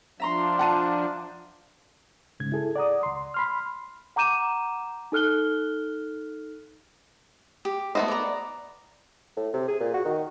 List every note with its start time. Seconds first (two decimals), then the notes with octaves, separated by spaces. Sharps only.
0.20 F3 D4 E5 A#5 C6
0.59 F#5 A5 D#7
2.40 G#2 C#3 G#6
2.52 E4 G#4 A4
2.76 D5 F#5 A#5 D#6
3.03 C#2 C6
3.34 B5 C6 F6
4.16 F#5 A#5 D6 G6 D#7 E7
5.12 D#4 A4 F6 F#6 G7
7.65 G4
7.95 A3 B3 C5 D#5
8.08 D5 A#5
9.37 A2
9.54 C3
9.68 G#4
9.80 A#2
9.94 F#4
10.05 D#3